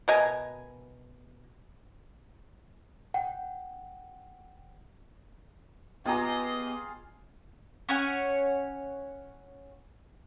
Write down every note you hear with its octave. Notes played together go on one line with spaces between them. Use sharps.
B2 A#4 D#5 G#5
F#5 G5
B3 F4 G4 G#4 D#5 G5 A#5
C#4 C#5 F#5 G#5